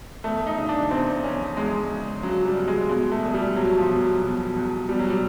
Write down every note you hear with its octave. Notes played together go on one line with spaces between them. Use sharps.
E2 A3
D#4
C#3
D4
E2 C4
E2 C#4
E2 G#3
C#3
C#3 F#3
G3
E2
G#3
B2 G#3
A3
E2
G3
B2 F#3
F3
B2
F#3
B2
E2
B2 G3
F#3
G3